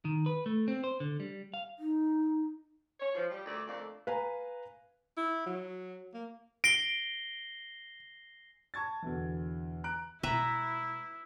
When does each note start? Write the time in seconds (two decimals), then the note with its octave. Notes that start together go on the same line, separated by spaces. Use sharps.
0.05 D#3
0.26 B4
0.46 A3
0.68 C4
0.84 C5
1.00 D3
1.20 G3
1.54 F5
1.79 D#4
3.00 C#5
3.15 F3
3.31 G3
3.45 D2 A#2 A3 D5
3.67 F2 D3 A3 A#3 D5
4.07 B4 F5 G#5 A#5
5.17 E4
5.46 F#3
6.14 A#3
6.64 A#6 C7 D7 G7
8.74 A5 C#6 G#6 A6
9.02 E2 B2 D3 E3
9.84 A#5 F#6 D7
10.23 B2 G#3 E4 B4 E5 A#5